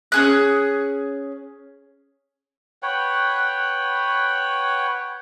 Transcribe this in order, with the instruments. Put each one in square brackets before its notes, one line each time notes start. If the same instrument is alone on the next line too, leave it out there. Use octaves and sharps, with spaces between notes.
[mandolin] C#4 G#4 F#6
[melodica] B4 C#5 F#5 G5